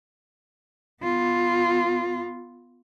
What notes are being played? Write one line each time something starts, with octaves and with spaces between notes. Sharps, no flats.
B3 F4